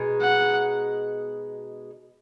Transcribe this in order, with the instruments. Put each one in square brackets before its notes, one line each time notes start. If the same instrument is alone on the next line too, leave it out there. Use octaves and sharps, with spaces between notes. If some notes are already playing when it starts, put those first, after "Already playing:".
Already playing: [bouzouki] B2 G#3 D#4
[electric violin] F#5